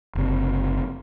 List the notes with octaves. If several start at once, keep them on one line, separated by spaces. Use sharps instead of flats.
F#1 C3